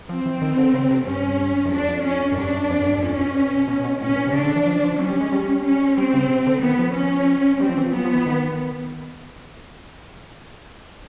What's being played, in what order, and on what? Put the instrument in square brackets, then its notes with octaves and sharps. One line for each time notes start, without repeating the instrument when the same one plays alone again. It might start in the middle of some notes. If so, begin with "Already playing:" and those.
[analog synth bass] F3 [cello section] C4
[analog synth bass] E3
D#3
D3
C#3
C3
[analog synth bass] G2 [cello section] C#4
[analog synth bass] F#2
[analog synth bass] F2 [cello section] D4
[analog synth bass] F2
[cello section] C#4
[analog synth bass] F#2
[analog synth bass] G2 [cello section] D4
[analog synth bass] F#2
F2
F#2
G2
[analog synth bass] F2 [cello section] C#4
[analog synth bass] B2
B2
B2
[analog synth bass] A2 [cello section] C#4
[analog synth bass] B2
C3
[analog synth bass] C#3 [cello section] D4
[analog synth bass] D3
E3
F3
F3
[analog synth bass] F#3 [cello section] C#4
[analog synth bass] G3
G#3
G3
[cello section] C#4
[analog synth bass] G3 [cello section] C4
[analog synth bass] C#3
C3
D3
[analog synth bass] D#3 [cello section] B3
[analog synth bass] F3
[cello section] C#4
[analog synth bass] G3 [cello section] C4
[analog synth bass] F3
E3
F3
[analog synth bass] F#3 [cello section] B3
[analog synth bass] F3
E3
D#3